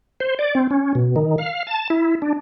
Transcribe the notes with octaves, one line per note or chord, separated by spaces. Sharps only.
C5
D5
C4
C#4
B2
D#3
F5
A5
E4
D4